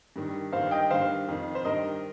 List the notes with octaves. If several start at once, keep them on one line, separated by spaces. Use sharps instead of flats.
G2 D#3
G2 D#3 C5 F5
D#5 G5
G2 D#3 C5 F5
F2 D#3
C5
G2 D#3 A#4 D#5